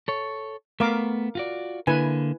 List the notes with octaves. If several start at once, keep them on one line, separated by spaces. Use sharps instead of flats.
A4 C#5
A3 B3 A#4 F5 D6
F4 F#4 D5
D3 A#3 E4 B4 G#5